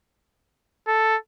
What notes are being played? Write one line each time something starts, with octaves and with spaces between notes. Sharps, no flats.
A4